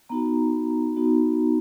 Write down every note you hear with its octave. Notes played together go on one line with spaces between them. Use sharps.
B3 D#4 F#4 A#5
B3 D#4 F#4